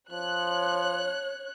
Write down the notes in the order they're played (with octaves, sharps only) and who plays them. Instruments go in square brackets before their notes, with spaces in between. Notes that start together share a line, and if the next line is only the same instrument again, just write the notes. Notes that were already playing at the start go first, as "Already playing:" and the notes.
[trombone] F3 [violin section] C#5 F#6